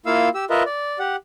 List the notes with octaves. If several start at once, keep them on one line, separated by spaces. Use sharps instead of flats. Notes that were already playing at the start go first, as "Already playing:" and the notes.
A#3 E4 F4 F5 E6
G4 E6
F4 A#4 B4 D#5 E5
D5
G4 F#5